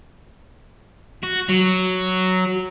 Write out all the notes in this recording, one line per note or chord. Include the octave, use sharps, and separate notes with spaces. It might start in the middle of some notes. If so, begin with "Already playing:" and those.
F#4
F#3